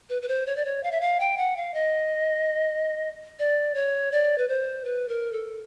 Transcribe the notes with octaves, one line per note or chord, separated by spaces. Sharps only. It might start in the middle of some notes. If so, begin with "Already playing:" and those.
B4
B4
C5
C#5
D5
C#5
F5
E5
F5
G5
F#5
F5
D#5
D5
C#5
D5
B4
C5
B4
A#4
A4